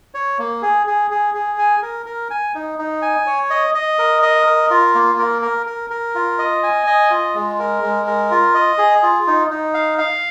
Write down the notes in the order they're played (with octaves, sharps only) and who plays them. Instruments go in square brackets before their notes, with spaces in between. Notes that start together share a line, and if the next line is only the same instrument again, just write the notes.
[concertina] C#5
A#3
G#4
G#4
G#4
G#4
G#5
A#4
A#4
G#5
D#4
D#4
G#5
C#5
D#5
D#5
A#4
D#5
A#4
F4
A#3
A#4
A#4
A#4
A#4
F4
D#5
G#5
D#5
F4
G#3
A#4
G#3
A#4
F4
D#5
G#4
F4
D#4
D#4
F5
F5